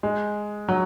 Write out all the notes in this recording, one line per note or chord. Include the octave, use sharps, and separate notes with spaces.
G#3
F#3